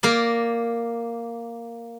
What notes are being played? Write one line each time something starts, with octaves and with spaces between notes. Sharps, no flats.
A#3 A#4 D5